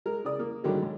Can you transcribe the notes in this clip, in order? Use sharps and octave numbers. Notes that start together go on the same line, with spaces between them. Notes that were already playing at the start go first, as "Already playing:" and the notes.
G#3 A#4
C#3 D5 D#6
A#3
G2 D3 D#3 F#3 G#3
G#2